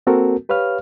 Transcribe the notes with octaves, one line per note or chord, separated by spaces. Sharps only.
A#3 C4 F#4 A4 A#4
G4 B4 C#5 F5 F6